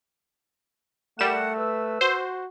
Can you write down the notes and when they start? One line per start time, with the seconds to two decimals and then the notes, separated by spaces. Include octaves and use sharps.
1.19 G3 A3 A#4 F#5 E7
1.57 B4 E6
2.01 F#4 C5